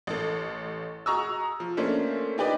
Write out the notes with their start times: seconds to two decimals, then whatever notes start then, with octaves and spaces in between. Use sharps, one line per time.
0.07 A1 A4
1.06 F#4 G#4 A#5 C#6 D#6 E6
1.60 F3
1.77 A3 A#3 C#4 D4 C5
2.38 D4 D#4 G4 B4 D5 D#5